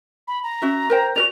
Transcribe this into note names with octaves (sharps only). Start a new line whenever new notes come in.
B5
A#5
C#4 F#4 E5
A#4 C5 G5
F#4 A#4 D5 F7